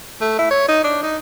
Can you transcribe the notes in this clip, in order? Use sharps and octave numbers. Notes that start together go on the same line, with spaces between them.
A3
E4
C#5
D#4
D4
D#4